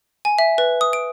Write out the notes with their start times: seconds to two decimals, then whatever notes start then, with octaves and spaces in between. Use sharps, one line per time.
0.25 G#5
0.39 E5
0.58 B4
0.81 D#6
0.93 D7